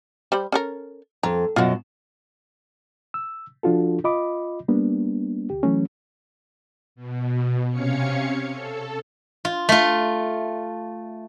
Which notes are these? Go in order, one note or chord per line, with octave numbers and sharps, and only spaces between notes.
G3 C5 B5
C#4 A4 A#4
F2 A#5
F#2 B2 F4 F#4
E6
F3 D4 F4 F#4 A4
F4 D#5 B5 D6
G3 A#3 B3 D4
D2 G4
E3 F#3 A3 C#4
B2
C3 C#4 C#5 F5 C#7
A4
F4
A3 F4